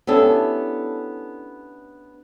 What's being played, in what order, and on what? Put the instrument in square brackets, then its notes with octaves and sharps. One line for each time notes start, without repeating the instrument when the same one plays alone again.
[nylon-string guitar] B3 C#4 D4 E4 G4 A4